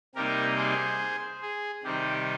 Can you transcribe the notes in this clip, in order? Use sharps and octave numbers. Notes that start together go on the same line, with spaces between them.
C3 G3 A#3 D#4 G4 A#4
G#4 C5
G#4
C3 D#3 G3 C4 D#4 G4